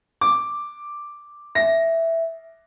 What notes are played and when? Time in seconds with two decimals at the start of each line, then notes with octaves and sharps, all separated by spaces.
0.21 D6
1.55 E5 A#6